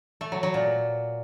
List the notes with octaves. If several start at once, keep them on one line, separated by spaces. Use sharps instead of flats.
A3
F#3
F#3
A#2